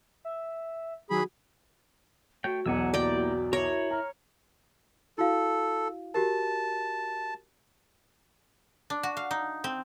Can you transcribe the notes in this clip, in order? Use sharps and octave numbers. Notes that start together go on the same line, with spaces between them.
E5
D#3 F#3 G#4 B5
A3 F#4 C#5 G5
B1 E2 F#3 F#5 G#5 E6
A#3 E4 G4 D5 G5
E4 A#4 C#5
A#5 F6
E4 F#4 A4 F5
F#4 G4 A#4 A5
D4
F#4
F5
D#4
C4